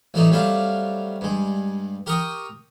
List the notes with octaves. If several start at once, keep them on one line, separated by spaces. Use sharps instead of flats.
A1 F#3 A3 D4 D#4
F#3 G3 A3 C4 D4 F5
G2 G#3
G4 A#4 G5 A#5 C#6 D#6